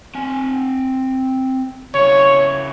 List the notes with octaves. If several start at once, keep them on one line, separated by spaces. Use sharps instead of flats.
C4 G#5
C#3 E4 C#5